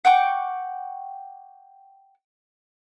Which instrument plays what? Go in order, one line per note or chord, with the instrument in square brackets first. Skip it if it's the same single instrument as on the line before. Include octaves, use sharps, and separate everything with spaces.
[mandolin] F#5 G5 C#6 D6